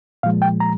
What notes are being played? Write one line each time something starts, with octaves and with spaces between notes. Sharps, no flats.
A#2 F3 G#3 F5
G5
A#5